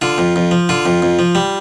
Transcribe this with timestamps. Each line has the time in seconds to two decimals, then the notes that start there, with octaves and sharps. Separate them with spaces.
0.01 D3 F4
0.18 F2
0.36 F2
0.51 F3
0.69 D3 F4
0.86 F2
1.02 F2
1.19 F3
1.35 G3